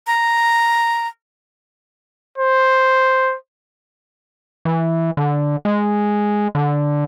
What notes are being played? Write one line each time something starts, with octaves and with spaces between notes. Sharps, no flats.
A#5
C5
E3
D3
G#3
D3